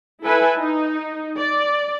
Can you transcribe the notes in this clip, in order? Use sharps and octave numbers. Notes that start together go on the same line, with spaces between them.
E4 A4 B4 E5 G#5
D#4
D5